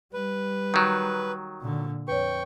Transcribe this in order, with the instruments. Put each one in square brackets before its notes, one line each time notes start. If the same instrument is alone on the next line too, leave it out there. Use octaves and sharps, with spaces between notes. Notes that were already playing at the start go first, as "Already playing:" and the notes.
[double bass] G3 [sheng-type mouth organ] B4
[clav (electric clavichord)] D#3 F#3 [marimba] G6
[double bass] A#2 D3
[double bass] F2 [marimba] B4 C#5 [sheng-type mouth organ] G5 C#6